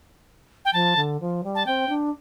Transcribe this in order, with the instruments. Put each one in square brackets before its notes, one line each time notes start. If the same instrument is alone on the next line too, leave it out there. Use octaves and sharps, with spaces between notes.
[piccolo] G5
[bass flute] F3 [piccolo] A5
[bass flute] D3
F3
G3
[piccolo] A5
[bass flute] C4 [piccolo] G5
[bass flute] D4